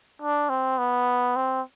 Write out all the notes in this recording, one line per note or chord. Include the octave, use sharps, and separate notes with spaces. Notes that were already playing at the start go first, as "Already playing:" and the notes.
D4
C4
B3
C4